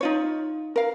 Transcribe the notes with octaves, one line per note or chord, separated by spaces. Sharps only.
D#4 F4 C#5
A#4 F5